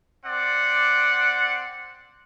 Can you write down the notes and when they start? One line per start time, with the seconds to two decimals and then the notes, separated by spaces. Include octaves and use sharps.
0.25 C4 D5 F#5